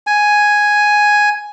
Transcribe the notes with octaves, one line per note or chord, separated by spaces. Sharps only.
G#5